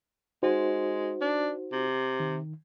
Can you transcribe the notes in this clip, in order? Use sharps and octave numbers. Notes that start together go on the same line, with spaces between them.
G#3 D#4 F#4 C5
D4
C3
D#3